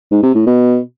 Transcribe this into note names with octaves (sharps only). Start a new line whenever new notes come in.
G#2
C3
A2
B2